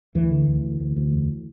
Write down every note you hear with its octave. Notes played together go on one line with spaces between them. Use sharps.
D2 E3
D3
D2
D2
D2
D2
E2